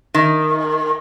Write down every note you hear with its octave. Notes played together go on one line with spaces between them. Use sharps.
D#3